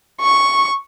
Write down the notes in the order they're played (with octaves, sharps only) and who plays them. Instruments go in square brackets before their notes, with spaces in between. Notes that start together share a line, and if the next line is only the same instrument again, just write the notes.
[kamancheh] C#6